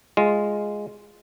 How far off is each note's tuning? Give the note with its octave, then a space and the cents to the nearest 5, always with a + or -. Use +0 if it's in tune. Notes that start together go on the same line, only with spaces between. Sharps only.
G#3 +0 F4 +0